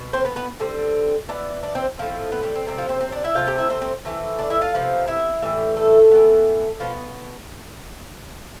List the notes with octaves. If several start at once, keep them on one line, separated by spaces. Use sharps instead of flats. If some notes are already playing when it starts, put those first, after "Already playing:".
Already playing: B2
C4 C5
B3 B4
B3 B4
D3 G3 C4
E3 B3 D4 D5
D4 D5
C4 C5
A2 F3 C4
B3 B4
G3 G4
C4
C3 G3 C4 D4
F3 F4
C4 C5
C4 C5
D4 D5
E4 E5
C3 E3 A3 C4 F4 F5
G4 G5
E4 E5
C4 C5
C4 C5
E3 A3 C4
D4 D5
E4 E5
F4 F5
C3 F3 B3
E4 E5
A2 E3 G3
A3 A4
E3 B3
B2 F3 B3 F4